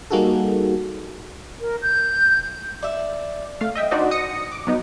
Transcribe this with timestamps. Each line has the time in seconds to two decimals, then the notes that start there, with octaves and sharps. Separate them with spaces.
0.11 G3 A#3 D#4 F#4 G#4 A4
1.61 A#4
1.82 G6
2.83 D5 E5
3.61 A3 F5
3.75 D#5 E5 G5
3.91 D4 D#4 F#4 C5 D5 D#5
4.11 D#6 A#6 C#7
4.51 D6
4.67 F#3 B3 D#4